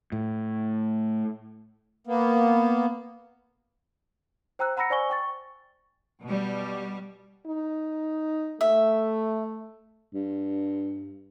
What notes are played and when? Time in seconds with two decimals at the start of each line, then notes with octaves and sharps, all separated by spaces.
0.12 A2
2.07 A#3 B3
4.59 C5 G5 A#5 E6 F#6
4.77 F#5 A#5 B5 E6 A#6 C#7
4.90 C5 D5 G#5 C#6 G7
5.10 G5 C#6 A6
6.24 B2 G3
7.46 D#4
8.61 A3 E5
10.14 G2